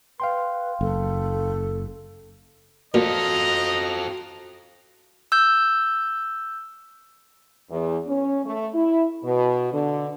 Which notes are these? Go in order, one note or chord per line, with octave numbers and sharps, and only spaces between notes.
B4 F5 G5 C6
F#1 A4
A#2 F4 F#4 A4 D#5 A#5
E6 G6
E2
C#4
A3
E4
B2
D3